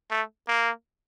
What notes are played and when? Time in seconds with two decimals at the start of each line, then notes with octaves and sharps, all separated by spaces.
0.11 A3
0.48 A#3